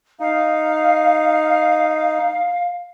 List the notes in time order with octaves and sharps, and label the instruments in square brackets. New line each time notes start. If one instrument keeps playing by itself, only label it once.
[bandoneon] D#4 [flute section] F5